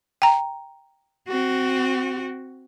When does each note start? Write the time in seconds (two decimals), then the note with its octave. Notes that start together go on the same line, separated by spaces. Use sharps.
0.22 G5 A#5
1.29 C4 F#4